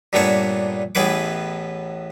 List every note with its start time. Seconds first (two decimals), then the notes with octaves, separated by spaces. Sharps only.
0.13 G2 A#2 A3 B3 D4 C#5
0.95 A1 A2 B3 G#4 B4 D6